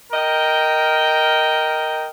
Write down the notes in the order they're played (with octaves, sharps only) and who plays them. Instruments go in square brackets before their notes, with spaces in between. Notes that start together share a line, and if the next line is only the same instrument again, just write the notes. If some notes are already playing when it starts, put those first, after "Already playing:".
[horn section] A#4 D#5 G5